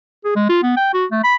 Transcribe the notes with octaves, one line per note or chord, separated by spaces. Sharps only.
G#4
G#3
F4
B3
G5
F#4
A3
B5